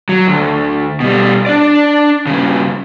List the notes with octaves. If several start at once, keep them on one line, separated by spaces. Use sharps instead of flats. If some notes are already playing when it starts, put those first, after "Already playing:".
F#3
D2
B2 G3
D4 D5
G2 C#3